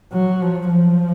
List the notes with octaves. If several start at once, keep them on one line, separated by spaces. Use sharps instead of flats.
F#3
F3
F3